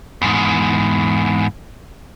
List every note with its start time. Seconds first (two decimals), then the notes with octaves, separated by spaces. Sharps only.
0.22 E2 G#2